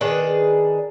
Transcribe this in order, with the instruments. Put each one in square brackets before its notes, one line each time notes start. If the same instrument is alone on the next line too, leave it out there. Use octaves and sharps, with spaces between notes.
[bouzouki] D#3 D4 G#4 B4